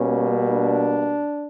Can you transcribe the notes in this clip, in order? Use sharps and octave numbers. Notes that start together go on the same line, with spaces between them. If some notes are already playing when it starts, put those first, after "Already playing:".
Already playing: B2 G3 A#3 C#4
D4